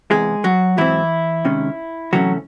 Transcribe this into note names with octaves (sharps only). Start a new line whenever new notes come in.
E2 C3 E3 G#3 G#4
F#3 F#4
G#2 E3 F#3 C4 E4
C3 D#3 G#3 C#4
C3 E3 F#3 A3 C#4 F#4